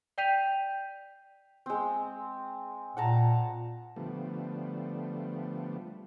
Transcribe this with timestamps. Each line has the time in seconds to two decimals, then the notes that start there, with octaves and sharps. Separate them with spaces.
0.18 D5 G5 G6 B6 D#7 F7
1.66 G#3 C4
2.97 A#2 F#5 A5 A#5
3.96 D3 F3 G3 A3 B3